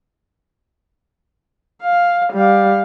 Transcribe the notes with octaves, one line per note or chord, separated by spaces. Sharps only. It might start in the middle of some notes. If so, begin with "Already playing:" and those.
F5
G3 F5